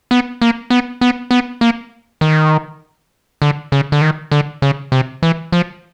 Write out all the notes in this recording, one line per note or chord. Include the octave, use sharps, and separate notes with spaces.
B3
A#3
B3
B3
B3
A#3
D#3
D3
C#3
D3
D#3
D3
C#3
C3
E3
F3